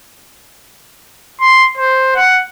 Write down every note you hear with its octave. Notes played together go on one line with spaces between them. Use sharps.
C6
C5
F#5